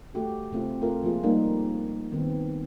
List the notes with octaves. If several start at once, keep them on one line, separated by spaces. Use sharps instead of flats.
A3 F#4 G4 A4
C3 A3 C4 F4 G4
A3 F4 A#4
F3 G#3 A#3 F4 G#4
G3 A#3 D#4
D#3 B3 C4